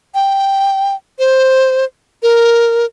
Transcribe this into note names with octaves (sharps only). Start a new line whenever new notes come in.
G5
C5
A#4